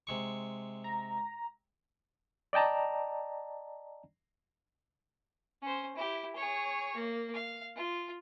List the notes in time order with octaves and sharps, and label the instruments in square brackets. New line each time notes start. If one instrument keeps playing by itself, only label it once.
[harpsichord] C3 G#3 C#6
[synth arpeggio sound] A#5
[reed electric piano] D5 D#5 G5 A5 A#5
[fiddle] C#4 C5
E4 G4
G#4 C#5
A#3
F5
F4